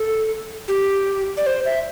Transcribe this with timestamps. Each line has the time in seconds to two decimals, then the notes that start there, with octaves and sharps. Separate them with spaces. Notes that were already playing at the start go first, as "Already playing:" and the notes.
Already playing: A4
0.68 G4
1.37 D5
1.47 C5
1.66 E5